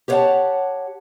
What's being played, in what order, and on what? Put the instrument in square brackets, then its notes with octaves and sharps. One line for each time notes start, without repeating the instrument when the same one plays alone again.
[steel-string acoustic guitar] G4 C5 C#5 F5 F#5 A5